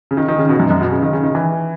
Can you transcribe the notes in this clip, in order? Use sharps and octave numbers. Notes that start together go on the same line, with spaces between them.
C#3
D#3
D#3
C#3
B2
F#2
F#2
B2
C#3
D#3
C#3
D#3
E3